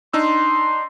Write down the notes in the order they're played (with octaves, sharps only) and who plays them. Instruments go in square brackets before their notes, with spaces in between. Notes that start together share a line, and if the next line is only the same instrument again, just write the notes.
[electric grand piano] D4 D#4 E6 [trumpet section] C6